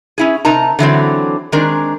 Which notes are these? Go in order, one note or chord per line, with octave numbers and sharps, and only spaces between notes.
C#4 E4 G#4
C3 D#4 A#4 A5 A#5
D3 E3 F#3 C4
D#3 G#3 C4 D4 A#4